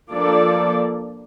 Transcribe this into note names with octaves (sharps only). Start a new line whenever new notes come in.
F3 A#3 D4 A4 D5